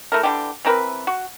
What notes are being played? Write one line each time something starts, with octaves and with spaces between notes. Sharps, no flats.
A3 E4 A#4
D3 E3 G3 G4
E3 C4 A#4 B4
F#4